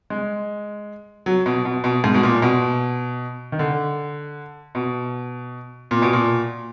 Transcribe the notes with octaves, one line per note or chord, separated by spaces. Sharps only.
G#3
F#3
B2
B2
B2
G#2
B2
A#2
B2
D#3
D3
B2
A#2
B2
A#2